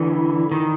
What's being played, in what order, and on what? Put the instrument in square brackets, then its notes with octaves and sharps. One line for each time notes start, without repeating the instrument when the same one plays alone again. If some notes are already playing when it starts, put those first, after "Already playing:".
Already playing: [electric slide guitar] D3 E3
D#3